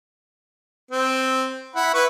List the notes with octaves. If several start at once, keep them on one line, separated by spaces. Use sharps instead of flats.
C4
E4 F#5 B5
E4 B4 C#6